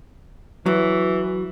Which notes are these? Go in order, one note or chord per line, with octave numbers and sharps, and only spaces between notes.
E3 F#3